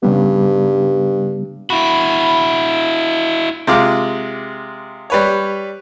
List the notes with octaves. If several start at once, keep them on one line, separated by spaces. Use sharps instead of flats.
G2 C#3 G3 B3
E4 F#4 B5
C3 G#3 F4 D6
G3 B4 C#5